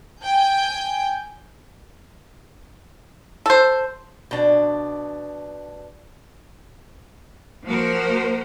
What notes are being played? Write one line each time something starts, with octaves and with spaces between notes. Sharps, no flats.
G5 G#5 G6
A4 C5
B2 D4
F3 A#3 F#4 A#4 C5